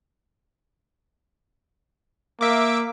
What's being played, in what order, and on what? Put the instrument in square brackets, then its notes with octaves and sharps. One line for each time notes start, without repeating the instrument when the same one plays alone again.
[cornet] A#3 [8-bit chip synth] E5 D6